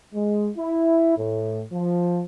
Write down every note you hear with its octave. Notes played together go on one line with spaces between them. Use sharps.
G#3
E4
A2
F3